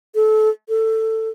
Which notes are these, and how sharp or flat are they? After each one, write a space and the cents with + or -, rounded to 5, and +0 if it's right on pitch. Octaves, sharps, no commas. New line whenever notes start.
A4 -25
A4 +15